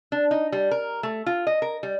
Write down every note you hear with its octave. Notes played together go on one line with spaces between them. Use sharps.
D4
D#4
G3
A#4
A3
F4
D#5
A#4
G3